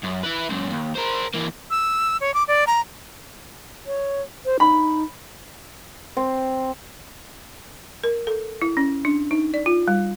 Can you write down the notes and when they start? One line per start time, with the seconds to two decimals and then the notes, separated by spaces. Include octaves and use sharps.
0.03 F#2
0.23 E4 B4
0.49 C#2 F#2
0.70 D#2
0.95 A#4 C5
1.34 E3 A#3
1.70 E6
2.21 C#5
2.34 D6
2.48 D5
2.67 A#5
3.87 C#5
4.45 C5
4.60 D#4 B5
6.17 C4
8.04 A#4
8.27 A4
8.62 E4
8.77 C#4
9.05 D4
9.31 D#4
9.54 D5
9.66 F4
9.88 G3